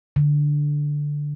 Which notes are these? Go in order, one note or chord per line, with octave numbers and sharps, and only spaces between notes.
D3